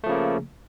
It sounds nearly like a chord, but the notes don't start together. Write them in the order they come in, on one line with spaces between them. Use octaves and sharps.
A3 F3 C#3 A#3